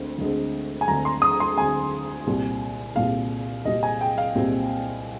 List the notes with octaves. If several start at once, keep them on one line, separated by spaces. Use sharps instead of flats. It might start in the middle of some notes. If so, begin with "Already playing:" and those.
Already playing: D2 D3 G#3 C4
D2 D3 G#3 C4
G#5
D2 D3 G#3 C4 A#5
C6
D#6
C6
D2 D3 G#3 C4 G#5
C2 A#2 G3 C4
C2 A#2 G3 C4 F5
C2 A#2 G3 C4 D#5
G#5
G5
F5
C2 A#2 G3 C4